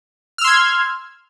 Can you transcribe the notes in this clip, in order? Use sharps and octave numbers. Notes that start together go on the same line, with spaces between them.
C6 E6 F6 G#6